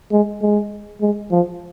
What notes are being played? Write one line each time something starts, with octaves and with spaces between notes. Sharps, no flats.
G#3
G#3
G#3
F3